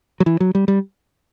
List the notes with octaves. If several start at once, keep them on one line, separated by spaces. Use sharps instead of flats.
F#3
E3
F#3
G3
G3